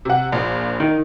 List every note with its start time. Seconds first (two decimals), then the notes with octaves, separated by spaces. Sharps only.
0.05 C3 F#5
0.32 A#1 A#2
0.80 D#3 D#4